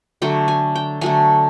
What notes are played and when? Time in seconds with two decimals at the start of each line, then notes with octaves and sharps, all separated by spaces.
0.22 D3 F#3 A3 G5
0.48 G#5
0.75 G5
1.01 D3 F#3 A3 G#5